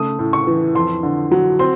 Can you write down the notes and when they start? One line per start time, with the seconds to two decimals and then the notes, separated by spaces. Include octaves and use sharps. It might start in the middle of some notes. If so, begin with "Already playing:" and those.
Already playing: C#3 A3 D#6
0.19 A2
0.33 C#6
0.47 E3
0.75 F2 C6
1.03 D3
1.32 F#3
1.59 C4 C6